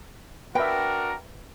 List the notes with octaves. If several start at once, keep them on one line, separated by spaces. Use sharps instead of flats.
D4 F#4 A#4 B4 E5 G5